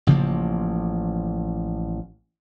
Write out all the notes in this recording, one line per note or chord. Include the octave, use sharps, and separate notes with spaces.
A1 C#3 F3 A#3